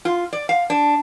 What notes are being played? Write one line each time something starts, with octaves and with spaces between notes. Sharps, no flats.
F4
D5
F5
D4